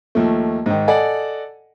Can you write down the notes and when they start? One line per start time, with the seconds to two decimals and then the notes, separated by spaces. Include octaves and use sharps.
0.15 D#2 F3 A3
0.66 G#2 D#3
0.88 A4 D5 D#5 F#5 G#5